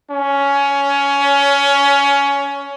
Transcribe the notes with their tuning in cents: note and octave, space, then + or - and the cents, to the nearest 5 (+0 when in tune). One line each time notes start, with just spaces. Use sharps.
C#4 +15